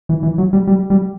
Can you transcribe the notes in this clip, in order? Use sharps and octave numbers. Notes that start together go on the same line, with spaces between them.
E3
E3
F#3
G3
G3
G3